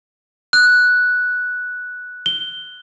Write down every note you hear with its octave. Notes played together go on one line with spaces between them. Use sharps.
F#6
G7